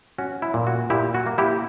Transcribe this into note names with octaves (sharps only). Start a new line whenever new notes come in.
C#4 F#4
E4
A#2
F#4
A#2 E4 G4
F#4
A#3
E4 G4